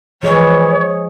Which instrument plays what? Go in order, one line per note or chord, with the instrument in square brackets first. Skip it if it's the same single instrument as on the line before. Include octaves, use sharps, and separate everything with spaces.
[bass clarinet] E3 [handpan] F3 G#4 D#5 [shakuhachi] C#5